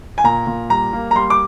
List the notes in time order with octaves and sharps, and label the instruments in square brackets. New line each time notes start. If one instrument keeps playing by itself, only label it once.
[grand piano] G#5
A#2 A#5
A#2
G3 A#5
A#3
A#5
G3 C6
D6